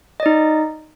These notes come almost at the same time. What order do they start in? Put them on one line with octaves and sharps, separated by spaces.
D#5 D5 D#4